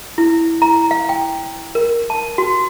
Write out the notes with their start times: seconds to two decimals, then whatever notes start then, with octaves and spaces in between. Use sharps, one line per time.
0.18 E4
0.62 A#5
0.91 F5
1.09 G5
1.75 A#4
2.10 A5
2.38 F#4